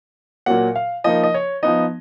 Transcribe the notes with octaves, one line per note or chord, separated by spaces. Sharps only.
A#2 F#3 A#3 F#5
F5
F3 A#3 D#4 D#5
D#5
C#5
F3 B3 D#4 D#5